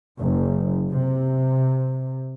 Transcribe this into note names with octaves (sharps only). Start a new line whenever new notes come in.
F#1
C3